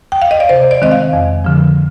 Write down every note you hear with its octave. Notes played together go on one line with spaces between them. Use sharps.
G5
F5
D#5
D5
C3 C5
D5
D#3 G#3 C4 D#5
F5
F2
D3 F3